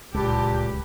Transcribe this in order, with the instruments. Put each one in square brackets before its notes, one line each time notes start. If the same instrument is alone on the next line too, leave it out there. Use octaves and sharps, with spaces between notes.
[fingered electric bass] D1 C#2 G#3 [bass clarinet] A#2 [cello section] G4 [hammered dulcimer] A4 B4 A5